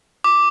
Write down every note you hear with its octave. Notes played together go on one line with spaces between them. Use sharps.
D6